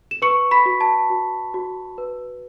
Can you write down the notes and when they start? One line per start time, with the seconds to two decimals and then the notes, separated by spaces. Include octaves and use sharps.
0.11 E7
0.22 B4 C#6 C#7
0.51 B5 B6
0.66 F#4
0.81 A5
1.10 F#4
1.54 F#4
1.98 B4